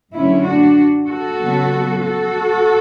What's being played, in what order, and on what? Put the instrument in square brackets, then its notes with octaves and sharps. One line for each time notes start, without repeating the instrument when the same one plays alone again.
[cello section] F#2 D3 F#3 A3 C#4 E4
D4 F#4
F#4 A4
C#3 F#3 B3
F#4 A4